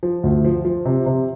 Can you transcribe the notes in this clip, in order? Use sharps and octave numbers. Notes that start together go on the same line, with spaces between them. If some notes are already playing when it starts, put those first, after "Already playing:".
F3
D2
F3
F3
C3
C3